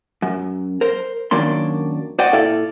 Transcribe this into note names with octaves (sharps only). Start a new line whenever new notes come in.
F#2
A#4 C5
F#2 D#3 F#3 A#3 D4 C6
F#4 C5 D5 D#5 F#5 G5
A#2 E4 A4 D5 F5